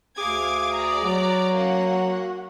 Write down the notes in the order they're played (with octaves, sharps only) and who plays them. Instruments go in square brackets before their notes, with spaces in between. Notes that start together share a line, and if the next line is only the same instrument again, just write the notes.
[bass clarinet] D2 [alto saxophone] G#4 [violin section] F5 D6 G#6
[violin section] D5 A#5
[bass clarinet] F#3 [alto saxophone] F#4
[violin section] A#3 C#4 F#5